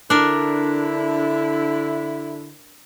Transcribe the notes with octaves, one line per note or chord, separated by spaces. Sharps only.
D3 D4 E4 A#4